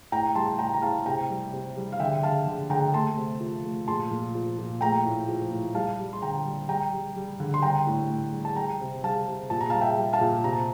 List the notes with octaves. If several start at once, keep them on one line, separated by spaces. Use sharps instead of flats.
A2 G5 A#5
G3 A5 C6
A2 G5 A#5
A#5
A2 F5 A5
C3 G5 A#5
G3
C3
G3
F5
D3 E5 G5
D3 F5 A5
D3
D3 G5 A#5
A3 A5 C6
C3
F3
A3
A#2 A5 C6
A#2
F3
A#2
A3 G5 A#5
A2
F3
A2
G3 F5 A5
G3
C6
D3 G5 A#5
G3
G3 G5 A#5
G3
G3
D3
C6
G3 G5 A#5
A2
A2
G3
A5
G3 G5 A#5
C3
G3 F5 A5
C3
A#2 A5
A#5
F5 A5
G3
E5 G5
G3
F5 A5
A#2
C3 A#5
A5